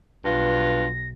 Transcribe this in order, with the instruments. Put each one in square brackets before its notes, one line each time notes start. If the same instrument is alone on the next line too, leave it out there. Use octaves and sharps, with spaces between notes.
[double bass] B1 [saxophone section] G2 F4 [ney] B4 [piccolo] A#6